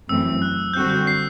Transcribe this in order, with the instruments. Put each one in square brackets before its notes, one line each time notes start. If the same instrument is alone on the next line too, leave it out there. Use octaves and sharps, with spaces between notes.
[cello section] F#2 E3 A3 C4 [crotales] E6
[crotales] F#6
[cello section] D3 G3 C4 F#4 [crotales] G6
[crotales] G6
C7